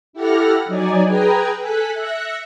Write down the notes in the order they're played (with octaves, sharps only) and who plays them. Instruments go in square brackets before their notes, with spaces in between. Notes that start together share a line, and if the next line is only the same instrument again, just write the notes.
[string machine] E4 G4 A4 F#5 F6 A#6
F#3 D#4 D5 G#5
G#4 B4 G5 G#5 A#5
A4 G#5 F#6 B6
E5 F#6 A#6 C#7